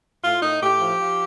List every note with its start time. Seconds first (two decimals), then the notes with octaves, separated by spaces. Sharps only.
0.23 A2 F4
0.42 A2 D#4
0.61 A2 G4
0.80 F3
1.00 F3